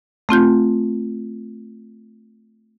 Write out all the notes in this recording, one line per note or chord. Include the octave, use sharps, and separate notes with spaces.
A3 C4 F4 G6